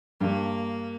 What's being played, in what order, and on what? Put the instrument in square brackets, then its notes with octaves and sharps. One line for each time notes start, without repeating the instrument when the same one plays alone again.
[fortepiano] G2 [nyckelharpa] A#3